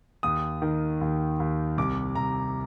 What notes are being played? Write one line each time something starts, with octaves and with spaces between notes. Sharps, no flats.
D#2 D#6
D#3
D#2
D#2
C2 D6
C2 A#5